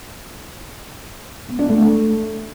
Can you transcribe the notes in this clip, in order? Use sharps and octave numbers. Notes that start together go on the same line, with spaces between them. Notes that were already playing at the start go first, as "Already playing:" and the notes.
B3
D4
A3